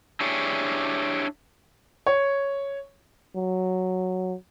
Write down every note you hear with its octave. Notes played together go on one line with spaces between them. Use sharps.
D4 E4 G4 G#4 C#5
C#5
F#3